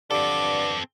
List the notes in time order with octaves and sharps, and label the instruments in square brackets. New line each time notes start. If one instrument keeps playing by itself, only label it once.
[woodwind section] G2 D3 [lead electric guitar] C4 A4 [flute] D6